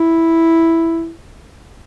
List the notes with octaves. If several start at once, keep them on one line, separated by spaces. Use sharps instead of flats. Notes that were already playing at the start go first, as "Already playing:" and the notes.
Already playing: E4